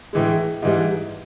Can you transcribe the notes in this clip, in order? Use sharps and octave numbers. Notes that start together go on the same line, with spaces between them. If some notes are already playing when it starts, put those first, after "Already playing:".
A2 E3 G#3
G#2 E3 G3